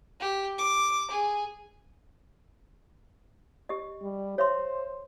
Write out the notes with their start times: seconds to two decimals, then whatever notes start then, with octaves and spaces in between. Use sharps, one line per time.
0.20 G4
0.58 D6
1.11 G#4
3.69 G4 D#5
4.02 G3
4.38 C5 C#5 E5 C6